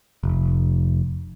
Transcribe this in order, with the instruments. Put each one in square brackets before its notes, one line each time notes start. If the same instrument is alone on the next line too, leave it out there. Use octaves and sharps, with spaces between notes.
[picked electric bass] F1